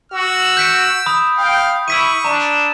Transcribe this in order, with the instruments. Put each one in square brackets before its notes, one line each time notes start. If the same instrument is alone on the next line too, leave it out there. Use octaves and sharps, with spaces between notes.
[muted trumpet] F#4 [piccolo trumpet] E6
[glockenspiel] G6 B6 D7
B5 D#6
[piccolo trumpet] F5 [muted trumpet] G5
[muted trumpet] E4 [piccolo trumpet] C#6 [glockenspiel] E6 B6 D#7
[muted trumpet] D4 [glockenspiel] A#5 E7